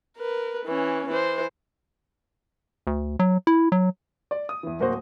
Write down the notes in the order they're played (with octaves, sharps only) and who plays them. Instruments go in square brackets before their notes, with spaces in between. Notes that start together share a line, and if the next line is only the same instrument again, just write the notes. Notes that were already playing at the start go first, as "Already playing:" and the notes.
[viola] A#4 B4
E3 C#4
E3 C5
[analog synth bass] D2
F#3
E4
F#3
[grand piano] D5
D#6
E2 E3
D1 A#3 F#4 C5